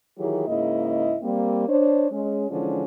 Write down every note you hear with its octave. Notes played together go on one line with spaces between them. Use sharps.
D#3 E3 F#3 E4 G4 G#4
G#2 C#3 A#3 E4 D#5
G3 A#3 C4
D4 C5 C#5
G#3 C#4
D3 E3 F3 G#3 C#4 D4